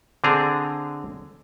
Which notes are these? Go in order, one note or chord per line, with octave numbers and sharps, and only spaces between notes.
D3 C4 D4 G#4 A#5